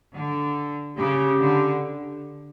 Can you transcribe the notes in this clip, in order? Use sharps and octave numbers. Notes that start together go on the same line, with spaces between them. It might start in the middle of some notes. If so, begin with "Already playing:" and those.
D3
C#3 G4
D3